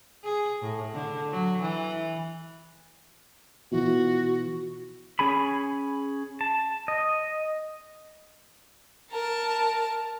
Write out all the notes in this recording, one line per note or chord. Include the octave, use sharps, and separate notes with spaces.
G#4
A2
D3
F#3
E3
B2 E3 F3 F#4
C#4 G#4 G#5 B5
A5
D#5
A#4 A5